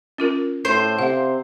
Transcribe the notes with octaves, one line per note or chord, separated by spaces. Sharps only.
C#4 F4 A#4
A2 C5
C3 F5 F#5